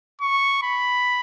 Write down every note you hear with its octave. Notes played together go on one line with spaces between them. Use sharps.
C#6
B5